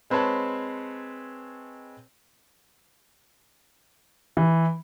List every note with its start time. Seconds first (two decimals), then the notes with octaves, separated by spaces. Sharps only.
0.10 G#3 C4 B4 C#5 A5 B5
4.37 E3